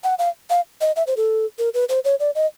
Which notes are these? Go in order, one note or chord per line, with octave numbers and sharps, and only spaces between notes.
F#5
F5
F5
D#5
E5
C5
A4
A#4
B4
C5
C#5
D5
D#5